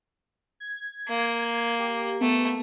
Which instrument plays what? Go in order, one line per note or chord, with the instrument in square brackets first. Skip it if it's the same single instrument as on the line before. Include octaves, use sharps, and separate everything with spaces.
[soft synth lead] G#6
[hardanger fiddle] A#3
[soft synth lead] G4
[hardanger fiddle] A3 [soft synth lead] B3